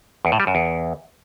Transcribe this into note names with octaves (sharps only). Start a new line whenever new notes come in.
E2
A2
G3
F#2
E2